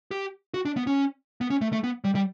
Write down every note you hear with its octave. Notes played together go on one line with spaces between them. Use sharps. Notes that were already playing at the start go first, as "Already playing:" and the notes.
G4
F#4
D4
B3
C#4
B3
C#4
A3
A3
B3
G3
G3